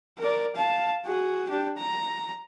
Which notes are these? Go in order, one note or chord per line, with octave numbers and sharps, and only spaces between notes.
A#4 D5
F5 A5
F#4 G#4
D4 G4
A#5